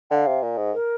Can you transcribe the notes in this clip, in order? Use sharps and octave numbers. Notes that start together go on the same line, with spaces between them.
D3 F5 G5
C3
A#2
G#2
A#4